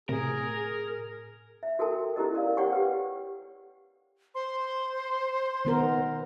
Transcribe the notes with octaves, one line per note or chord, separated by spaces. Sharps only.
A2 C3 G#4 A#4
E5
F#4 A4 A#4 G5 A5
C#4 E4 G4 A#4 D#5
A#4 D5 F5
G4 C#5 F#5 G5 C#6
G4 B4
C5 C6
D#3 B3 A#4